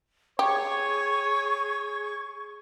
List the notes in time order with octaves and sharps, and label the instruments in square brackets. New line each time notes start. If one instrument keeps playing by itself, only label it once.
[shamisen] G4 [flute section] G#4 C#6 G#6 [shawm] C#5